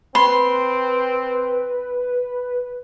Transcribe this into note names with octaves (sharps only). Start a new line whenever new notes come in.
C4 B4 B5 C6